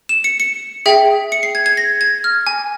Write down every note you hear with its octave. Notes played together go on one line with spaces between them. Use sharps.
E7
C#7
C#7
G#4 E5 G5
C#7
C7
G#6
G#6
A#6
G#6
F6
G#5